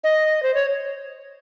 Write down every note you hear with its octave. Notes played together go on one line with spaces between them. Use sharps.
D#5
C5
C#5